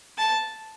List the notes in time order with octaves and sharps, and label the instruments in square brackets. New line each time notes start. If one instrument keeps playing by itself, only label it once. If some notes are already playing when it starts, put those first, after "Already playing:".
[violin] A5